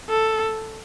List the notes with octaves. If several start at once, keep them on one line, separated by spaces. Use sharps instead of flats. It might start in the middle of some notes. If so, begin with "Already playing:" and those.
A4